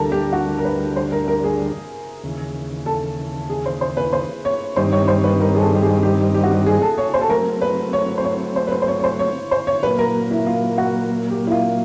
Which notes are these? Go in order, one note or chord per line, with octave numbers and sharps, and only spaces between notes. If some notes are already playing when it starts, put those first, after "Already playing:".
Already playing: D2 D3 G3 A4 A#4
G4
F#4
A#4
B4
C5
A#4
A#4
G#4
D#2 C#3 E3
A4
G#4
C5
C5
B4
C5
C#5
G2 D#3 G3 C4 D#4 C5
C#5
C5
B4
A#4
G#4
A4
G4
G#4
G4
G4
F#4
G4
G#4
A4
C#5
C5
A4
F#3 A3 C4 A#4
B4
C#5
C5
C#5
C5
B4
C5
C5
C#5
C#5
C5
C#5
C5
C#5
A#2 F#3 A#3 B4
A#4
E4
F4
F#4
G4
E4
F4